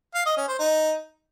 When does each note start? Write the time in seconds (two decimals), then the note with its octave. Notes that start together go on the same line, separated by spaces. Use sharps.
0.15 F5
0.26 D#5
0.37 C#4
0.48 C5
0.59 D#4